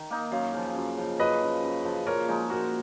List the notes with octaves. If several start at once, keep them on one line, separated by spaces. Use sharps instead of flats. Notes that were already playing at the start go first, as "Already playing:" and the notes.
Already playing: D#3
A#3 D#4
F#2 C#5 F5
C#3 F3
F#2
C#3 F3
F#2 B4 D#5
C#3 F3
F#2
C#3 F3
A#2 A#4 C#5
F3 G#3 D#4
A#2 F#4 A#4